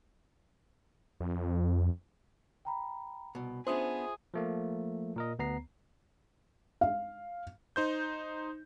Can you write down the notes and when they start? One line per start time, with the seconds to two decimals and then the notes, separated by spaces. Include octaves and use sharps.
1.21 F2
2.65 G5 A#5 B5
3.35 C2 B2
3.67 B3 C#4 D4 F4 G#4 C5 E5 D#6
4.34 F3 A3 A#3
5.16 A#2 A#4 D#5
5.39 D2 B3 A#5 C7
6.81 F5
7.76 D#4 C5 G6